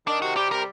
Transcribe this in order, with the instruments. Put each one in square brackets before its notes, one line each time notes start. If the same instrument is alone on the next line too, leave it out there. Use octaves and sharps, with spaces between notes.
[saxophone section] D#3 [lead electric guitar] D4
[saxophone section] C3 [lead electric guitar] F#4
[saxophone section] G3 [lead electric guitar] G4
[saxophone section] C3 [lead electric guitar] A#4